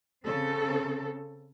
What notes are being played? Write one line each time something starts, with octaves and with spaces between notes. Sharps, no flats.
C#3 C4 A4